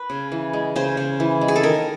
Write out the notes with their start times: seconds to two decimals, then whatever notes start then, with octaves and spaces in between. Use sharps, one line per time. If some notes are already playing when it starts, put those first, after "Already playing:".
Already playing: B4
0.10 C#3
0.32 E3
0.53 G#3
0.76 C#3 C5
0.97 C#3
1.20 E3
1.41 G#3
1.48 G#4
1.56 A4
1.63 D#3 A#4